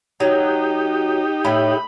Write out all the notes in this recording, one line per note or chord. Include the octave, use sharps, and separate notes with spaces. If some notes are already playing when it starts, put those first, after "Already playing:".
F#3 D#4 G4
A2 B5